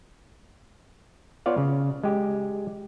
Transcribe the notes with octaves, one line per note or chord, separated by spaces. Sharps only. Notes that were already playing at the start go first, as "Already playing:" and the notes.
B3 F4 C#5 D5 F5
C#3
G#3 G4